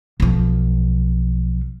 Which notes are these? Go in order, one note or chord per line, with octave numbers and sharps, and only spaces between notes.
B1 F3